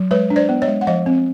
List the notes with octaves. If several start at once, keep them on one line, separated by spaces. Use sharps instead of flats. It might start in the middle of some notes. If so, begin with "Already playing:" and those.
Already playing: F#3
G#3 B4 C#5
D4
C5 D5
B3
C#5 D#5
G#3
F#5
F3 D#5 F5
C4